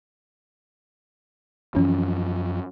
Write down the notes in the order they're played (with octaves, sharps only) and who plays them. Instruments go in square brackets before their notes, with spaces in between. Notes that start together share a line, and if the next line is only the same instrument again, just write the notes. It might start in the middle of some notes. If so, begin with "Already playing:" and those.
[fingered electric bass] F#2 F3 [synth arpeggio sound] E3 C#4